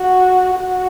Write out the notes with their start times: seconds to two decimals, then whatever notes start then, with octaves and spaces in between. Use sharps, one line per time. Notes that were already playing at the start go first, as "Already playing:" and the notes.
Already playing: F#4
0.57 F#4